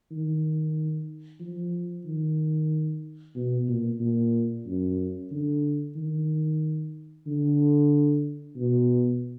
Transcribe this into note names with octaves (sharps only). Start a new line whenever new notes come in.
D#3
F3
D#3
B2
A#2
A#2
F#2
D3
D#3
D3
B2